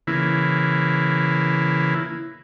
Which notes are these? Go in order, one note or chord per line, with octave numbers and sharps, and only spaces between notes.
C#3 E3 A#3 E4